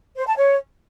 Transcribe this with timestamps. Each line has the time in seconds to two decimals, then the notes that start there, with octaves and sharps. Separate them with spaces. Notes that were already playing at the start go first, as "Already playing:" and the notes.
0.16 C5
0.27 A5
0.37 C#5